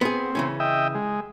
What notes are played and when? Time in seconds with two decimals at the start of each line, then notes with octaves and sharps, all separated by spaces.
0.01 B3 C4 G#4
0.35 C#3 E3 C#4
0.60 D#5 E5 G5
0.95 G#3